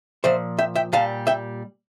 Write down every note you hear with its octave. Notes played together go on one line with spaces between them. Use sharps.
A#2 F3 C5 E5
E5 G5
E5 G5
A#2 G3 F5 A5
E5 G5